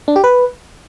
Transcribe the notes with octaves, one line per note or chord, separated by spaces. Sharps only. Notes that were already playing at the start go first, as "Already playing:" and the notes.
D4
G4
B4